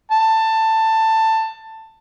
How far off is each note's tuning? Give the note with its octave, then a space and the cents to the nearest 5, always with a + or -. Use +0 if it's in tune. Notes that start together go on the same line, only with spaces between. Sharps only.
A5 +15